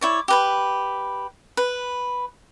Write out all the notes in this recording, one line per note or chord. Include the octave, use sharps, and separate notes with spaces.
E4 C#5 D5
G4 B4 B5
B4